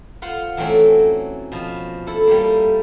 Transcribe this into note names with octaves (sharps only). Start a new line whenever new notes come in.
F4 C5 F#5
E3 F#3 A3 C4 C#4
B2 F3
E4 A4
G3 A3 A#3